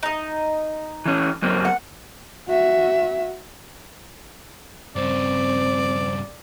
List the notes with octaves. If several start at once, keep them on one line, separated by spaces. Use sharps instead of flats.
D#4 D#5
E3 C#4
F#2 A#3 C4
F#5
F#4 E5
G2 C#3 C4 C5 D5